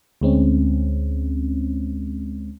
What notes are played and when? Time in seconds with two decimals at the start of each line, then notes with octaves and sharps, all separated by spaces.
0.21 D2 G#3 C4 C#4